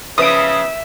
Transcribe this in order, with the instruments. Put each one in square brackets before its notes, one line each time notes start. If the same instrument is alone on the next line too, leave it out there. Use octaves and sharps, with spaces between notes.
[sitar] C#3 F3 [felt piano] B4 D7 [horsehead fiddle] E5 [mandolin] D#6